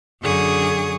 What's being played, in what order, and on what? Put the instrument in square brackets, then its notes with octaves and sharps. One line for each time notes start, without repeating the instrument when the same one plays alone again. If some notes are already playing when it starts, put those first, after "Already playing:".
[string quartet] F#2 D3 G#4 C#6 D#6